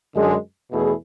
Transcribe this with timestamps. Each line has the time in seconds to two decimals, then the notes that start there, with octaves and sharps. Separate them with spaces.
0.15 F#2 D3 G#3
0.72 E2 B2 A3 E4 G#4